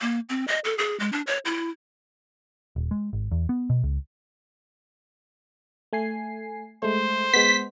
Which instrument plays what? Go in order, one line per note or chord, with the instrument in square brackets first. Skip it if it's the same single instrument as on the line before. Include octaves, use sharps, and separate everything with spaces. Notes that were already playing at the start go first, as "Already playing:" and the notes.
[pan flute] A#3
C4
D#5
A4
G#4
G#3
D4
C#5
E4
[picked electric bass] D#1
G#3
G#1
E2
B3
B2
C#2
[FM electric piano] A3 G#5 C7
[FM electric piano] G#3 A3 [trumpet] C5
[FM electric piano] G#3 B3 [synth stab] B6